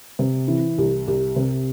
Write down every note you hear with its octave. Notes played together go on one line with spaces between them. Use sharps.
C3
E3
C2
C2
C3